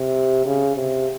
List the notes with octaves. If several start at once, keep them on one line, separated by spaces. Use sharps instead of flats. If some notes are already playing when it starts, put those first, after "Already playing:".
Already playing: C3
C#3
C3